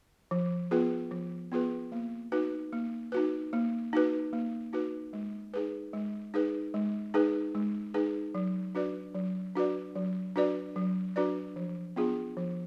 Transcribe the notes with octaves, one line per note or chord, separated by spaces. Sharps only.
F3
B3 F4 G#4 B4
F3
B3 F4 G#4 B4
A#3
D#4 F#4 B4
A#3
D#4 F#4 B4
A#3
D#4 F#4 B4
A#3
D#4 F#4 B4
G#3
D#4 G#4 B4
G#3
D#4 G#4 B4
G#3
D#4 G#4 B4
G#3
D#4 G#4 B4
F#3
D4 F#4 B4 D5
F#3
D4 F#4 B4 D5
F#3
D4 F#4 B4 D5
F#3
D4 F#4 B4 D5
F3
B3 D4 F4 G#4
F3